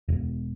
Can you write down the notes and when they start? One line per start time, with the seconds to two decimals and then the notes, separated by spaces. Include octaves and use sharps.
0.08 E1